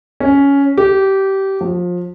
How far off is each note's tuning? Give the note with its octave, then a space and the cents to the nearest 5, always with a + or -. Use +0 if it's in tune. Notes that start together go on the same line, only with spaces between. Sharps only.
C#4 +10
G4 -20
F3 +25